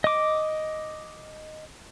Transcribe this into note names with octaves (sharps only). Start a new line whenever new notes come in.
D#5 D6